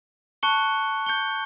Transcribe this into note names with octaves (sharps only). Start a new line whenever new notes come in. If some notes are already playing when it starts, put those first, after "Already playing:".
A5 C#6 F#6 C#7 G7
G6 C#7 G7